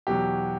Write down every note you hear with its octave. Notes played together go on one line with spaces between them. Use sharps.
E2 B2 F#3 G4